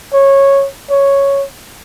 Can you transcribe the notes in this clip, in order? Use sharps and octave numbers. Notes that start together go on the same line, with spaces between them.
C#5
C#5